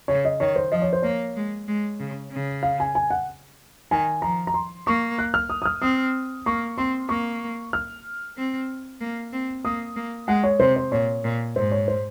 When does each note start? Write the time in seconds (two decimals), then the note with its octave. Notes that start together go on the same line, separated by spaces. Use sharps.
0.08 C#3 C#5
0.25 D#5
0.40 D#3 C#5
0.56 C5
0.72 F3 D#5
0.82 C#5
0.93 C5
1.02 A#3 C#5
1.36 G#3
1.68 G#3
2.00 C#3
2.31 C#3
2.63 F5
2.80 G#5
2.95 G#5
3.11 F#5
3.91 D#3 G#5
4.22 F3 A#5
4.47 A#5
4.54 C6
4.87 A#3 C#6
5.19 F#6
5.34 F6
5.50 D#6
5.62 D#6
5.65 F6
5.82 C4 D#6
6.46 A#3 C#6
6.78 C4 C6
7.09 A#3 C#6
7.73 F6
8.37 C4
9.01 A#3
9.32 C4
9.65 A#3 D#6
9.96 A#3
10.28 G#3 F#5
10.44 C#5
10.60 C3 C5
10.76 C5
10.92 A#2 C#5
11.24 A#2
11.56 G#2 C5
11.72 C#5
11.88 C5